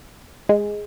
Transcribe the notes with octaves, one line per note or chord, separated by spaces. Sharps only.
G#3